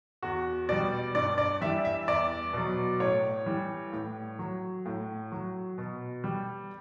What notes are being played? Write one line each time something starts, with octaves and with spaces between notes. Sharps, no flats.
E2 F#4
B2 G3 D5
G2 D5
D5
E3 G3 E5
E5
E2 D5
B2 F#3
A2 C#5
E3 G3
A2
F#3
A2
F#3
B2
G3